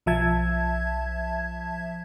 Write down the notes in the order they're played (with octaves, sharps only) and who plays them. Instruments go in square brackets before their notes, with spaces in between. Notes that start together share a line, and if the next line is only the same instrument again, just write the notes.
[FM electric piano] B1 F3 E5 A5 G#6